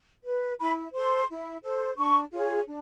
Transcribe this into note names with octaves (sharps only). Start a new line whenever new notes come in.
B4
E4 B5
A4 C5 C6
E4
A4 C5
D4 C#6
F4 G#4 C#5
D4